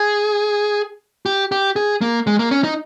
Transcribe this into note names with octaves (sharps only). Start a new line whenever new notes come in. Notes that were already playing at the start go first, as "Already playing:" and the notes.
Already playing: G#4
G4
G4
G#4
A#3
G#3
A#3
C#4
D#4